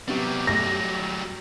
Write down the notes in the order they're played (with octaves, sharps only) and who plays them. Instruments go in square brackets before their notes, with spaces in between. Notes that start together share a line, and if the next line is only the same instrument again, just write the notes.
[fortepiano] C3 B3 [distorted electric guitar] F#3 G3 [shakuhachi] G4
[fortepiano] A3 [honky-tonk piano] A#6